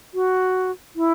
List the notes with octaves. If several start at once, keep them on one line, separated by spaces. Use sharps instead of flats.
F#4
E4